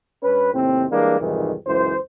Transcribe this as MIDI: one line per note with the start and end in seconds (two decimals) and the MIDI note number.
0.23 0.49 43
0.23 0.49 61
0.23 0.49 71
0.53 0.85 39
0.53 0.85 45
0.53 0.85 48
0.53 0.85 60
0.90 1.17 52
0.90 1.17 55
0.90 1.17 56
0.90 1.17 58
0.90 1.17 62
1.20 1.53 36
1.20 1.53 41
1.20 1.53 44
1.20 1.53 51
1.20 1.53 52
1.66 1.95 37
1.66 1.95 42
1.66 1.95 52
1.66 1.95 72